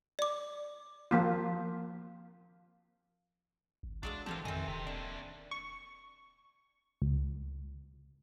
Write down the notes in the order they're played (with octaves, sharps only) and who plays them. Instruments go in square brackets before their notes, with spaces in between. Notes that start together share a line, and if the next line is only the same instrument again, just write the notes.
[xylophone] D5 D6
[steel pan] F3 A#3 F4
[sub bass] G#1
[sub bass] A1 [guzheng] F#3 G#3 F4 [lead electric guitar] D4
[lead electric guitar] D3 C4 [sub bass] E3 [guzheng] G4 A4 F5
[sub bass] F2 [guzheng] D#3 C4 [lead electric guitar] G#4 E5
[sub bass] D#1 [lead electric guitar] C3
[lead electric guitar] A#3 D4 [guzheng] E5
[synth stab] C#6
C#2